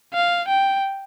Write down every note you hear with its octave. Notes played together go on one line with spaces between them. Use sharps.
F5
G5